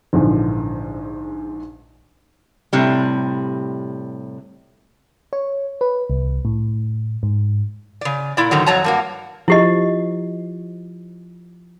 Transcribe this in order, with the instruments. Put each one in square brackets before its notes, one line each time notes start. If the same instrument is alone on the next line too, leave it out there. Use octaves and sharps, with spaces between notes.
[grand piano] A#1 G#2 D3 E3 F3
[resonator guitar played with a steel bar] A2 C3 G3
[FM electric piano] C#5
B4
C2
A2
G#2
[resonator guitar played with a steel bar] C#3 D5
A#2 E4 D5
G#2 D3 D#3 F#3
F2 F#3 C#5 A5 A#5
G2 A#3 F#4
[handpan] F3 [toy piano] E4 G4 D#5